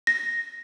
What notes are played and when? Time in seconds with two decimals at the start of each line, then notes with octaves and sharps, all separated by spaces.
0.07 A#6